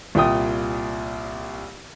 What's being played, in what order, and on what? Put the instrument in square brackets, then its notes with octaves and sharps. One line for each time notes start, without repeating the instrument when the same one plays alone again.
[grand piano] C2 A#2 G5 D#6